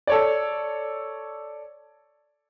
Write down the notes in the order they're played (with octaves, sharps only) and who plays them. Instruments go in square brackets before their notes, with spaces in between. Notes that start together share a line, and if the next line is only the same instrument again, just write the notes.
[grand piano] A4 C#5 D5